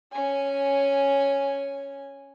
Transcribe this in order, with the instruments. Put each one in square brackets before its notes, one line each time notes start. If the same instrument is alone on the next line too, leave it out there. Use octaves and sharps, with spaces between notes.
[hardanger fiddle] C#4 G#5